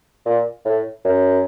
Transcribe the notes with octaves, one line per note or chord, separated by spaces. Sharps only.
A#2
A2
F#2